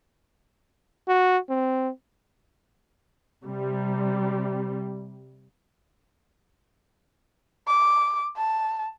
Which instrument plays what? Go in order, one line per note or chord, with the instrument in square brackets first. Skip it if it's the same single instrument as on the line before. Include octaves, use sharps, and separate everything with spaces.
[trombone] F#4
C4
[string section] C3 G3
[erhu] D6
A5